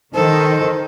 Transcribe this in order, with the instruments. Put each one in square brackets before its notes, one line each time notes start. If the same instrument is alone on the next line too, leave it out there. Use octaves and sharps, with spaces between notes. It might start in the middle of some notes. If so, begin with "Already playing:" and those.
[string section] D#3 [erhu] A4 [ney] C5